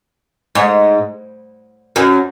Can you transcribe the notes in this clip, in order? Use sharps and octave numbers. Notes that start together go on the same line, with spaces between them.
G#2
F#2